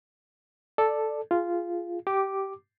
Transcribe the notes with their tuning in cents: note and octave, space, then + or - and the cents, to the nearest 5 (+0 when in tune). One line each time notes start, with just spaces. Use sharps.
A4 +0 D5 +10
F4 -10 G#4 +0
G4 -15 D6 +0